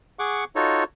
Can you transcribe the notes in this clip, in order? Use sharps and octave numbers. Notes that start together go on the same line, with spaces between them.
G#4 F#5 C#6 D6
D#4 F4 F#4 A4 C#5